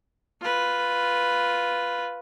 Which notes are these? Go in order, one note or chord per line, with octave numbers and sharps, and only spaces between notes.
F4 B4